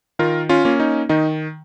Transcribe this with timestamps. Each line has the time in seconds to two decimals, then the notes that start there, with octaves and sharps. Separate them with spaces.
0.19 D#3 F4 A#4
0.49 C#4 F4
0.65 A#3 C#4
0.80 D#4
1.09 D#3 D#4